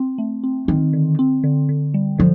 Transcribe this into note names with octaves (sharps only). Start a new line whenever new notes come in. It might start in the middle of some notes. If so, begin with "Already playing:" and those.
Already playing: C4
A3
C4
D#3 C4
D3
C4
D3
D3
G3
D3 F3